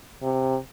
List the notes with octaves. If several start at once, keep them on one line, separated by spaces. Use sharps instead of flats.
C3